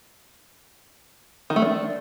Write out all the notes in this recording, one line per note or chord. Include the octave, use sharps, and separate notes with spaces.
D#3
A3
D4